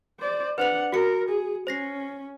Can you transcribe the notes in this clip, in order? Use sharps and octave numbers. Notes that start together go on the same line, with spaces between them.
C5 D5
D4 B4 C5 F#5 F7
F#4 A#4 C#7
G#4
C#4 C5 A#6 C7